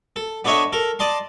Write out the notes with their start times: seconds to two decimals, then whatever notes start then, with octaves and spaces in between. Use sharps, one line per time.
0.16 A4
0.45 B3 D4 A4 C#5 D#5 E5
0.73 A4 A#4
0.99 D5 D#5 A5 C6